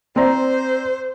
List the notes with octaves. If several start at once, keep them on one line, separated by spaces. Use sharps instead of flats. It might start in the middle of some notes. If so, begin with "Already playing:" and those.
C4 C5 D5 A#5